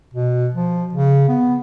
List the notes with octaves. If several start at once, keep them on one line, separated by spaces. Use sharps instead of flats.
B2
F3
C#3
B3